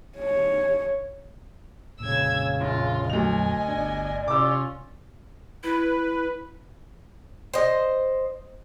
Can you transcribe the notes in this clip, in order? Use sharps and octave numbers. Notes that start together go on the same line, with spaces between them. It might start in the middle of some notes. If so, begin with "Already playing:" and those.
C#5
F2 A#2 C#3 E6 G#6
A#1 F4
D2 F#3 D#5 G#5 F7
G1 D4 D5
C3 C#4 F4 D6 E6
E4 B4
C5 D#5